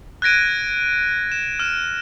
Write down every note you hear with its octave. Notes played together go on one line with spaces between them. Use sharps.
F#6 G#6 A#6 D7 D#7
E7
F6 E7